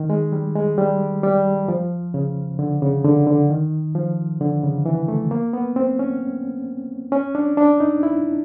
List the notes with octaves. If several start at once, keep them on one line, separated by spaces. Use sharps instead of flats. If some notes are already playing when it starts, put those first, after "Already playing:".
Already playing: D#3
G#3
G3
G#3
G3
G3
F3
C#3
D3
C#3
D3
D3
D#3
F3
D3
C#3
E3
A3
A#3
B3
C4
C#4
C#4
D4
D4
D#4
E4